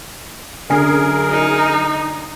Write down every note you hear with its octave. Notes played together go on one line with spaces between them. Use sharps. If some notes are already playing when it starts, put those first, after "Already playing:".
F#2 D3 G#4 A#4 G#5 C7
D#4